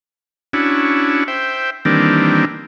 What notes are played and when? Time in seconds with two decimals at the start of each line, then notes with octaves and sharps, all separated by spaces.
0.53 C#4 D4 E4 F#4
1.28 C5 E5 G5
1.85 D#3 E3 G3 A#3 C4 D4